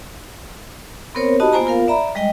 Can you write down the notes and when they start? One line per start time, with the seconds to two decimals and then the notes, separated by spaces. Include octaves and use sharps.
1.15 B3 C4 A#4 C5 C#5
1.40 D#4 F#4 G4 D#5 A5 B5
1.53 A#3 B3 F4 C5 G#5 A#5
1.66 B3 F4 A#4 F5
1.88 D5 E5 A#5 B5
2.15 G3 G#3 D#5 G5